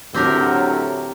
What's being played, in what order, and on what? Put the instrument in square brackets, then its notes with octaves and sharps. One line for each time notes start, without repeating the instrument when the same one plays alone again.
[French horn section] A2 D3 F#3 [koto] C4 G4 A#4